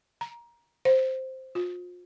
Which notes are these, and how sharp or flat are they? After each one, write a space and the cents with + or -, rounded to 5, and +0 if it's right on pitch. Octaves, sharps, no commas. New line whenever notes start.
A#5 +20
C5 +0
F4 +35